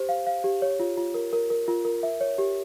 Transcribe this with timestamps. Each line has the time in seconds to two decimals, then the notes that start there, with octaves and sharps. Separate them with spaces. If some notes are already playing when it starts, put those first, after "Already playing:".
Already playing: G4 C5
0.09 F5
0.27 F5
0.44 G4
0.62 C#5
0.80 F4
0.97 F4
1.14 A#4
1.33 A#4
1.50 A#4
1.68 F4
1.85 A#4
2.03 E5
2.21 C#5
2.38 G4